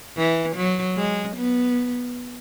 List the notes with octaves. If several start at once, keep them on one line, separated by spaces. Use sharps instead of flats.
E3
F#3
G#3
B3